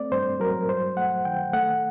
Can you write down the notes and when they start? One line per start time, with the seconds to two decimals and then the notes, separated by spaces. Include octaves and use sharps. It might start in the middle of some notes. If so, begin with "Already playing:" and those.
Already playing: A3 C4 D5
0.12 G2 C5
0.40 F#3 A#4
0.69 G2 C5
0.97 A3 F#5
1.25 D#3 G5
1.53 A3 F#5